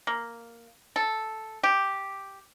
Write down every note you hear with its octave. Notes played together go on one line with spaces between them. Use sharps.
A#3
A4
G4